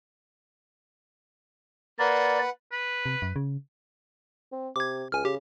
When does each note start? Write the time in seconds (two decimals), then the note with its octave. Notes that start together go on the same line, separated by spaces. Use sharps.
1.99 A#3 B4 D5 F#5 B5
2.72 B4
3.06 C3
3.22 F#2
3.36 C#3
4.52 C4
4.76 C3 D6 G#6
5.12 C#2 G#5 F6
5.25 C#3 G4